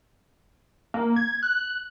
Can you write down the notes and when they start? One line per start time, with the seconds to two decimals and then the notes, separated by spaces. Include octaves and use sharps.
0.94 A#3
1.16 G#6
1.43 F#6